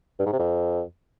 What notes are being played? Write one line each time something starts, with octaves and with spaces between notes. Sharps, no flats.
G2
G#2
C3
F2